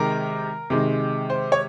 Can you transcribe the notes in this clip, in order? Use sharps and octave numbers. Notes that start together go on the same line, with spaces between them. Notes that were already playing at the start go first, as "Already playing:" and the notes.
Already playing: C3 D#3 G#3 A#4
C3 D#3 G#3
C5
C#5